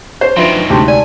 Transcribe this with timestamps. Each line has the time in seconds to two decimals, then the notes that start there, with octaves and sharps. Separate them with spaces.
0.21 C5 C#5
0.37 D#3 F3 F#3 D4 B4 E5 C6
0.70 D2 C3 G#3 D#4 G4 C6
0.88 D5 G#5